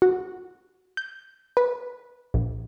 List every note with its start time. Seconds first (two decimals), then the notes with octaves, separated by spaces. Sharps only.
0.02 F#4
0.97 G6
1.57 B4
2.34 A#1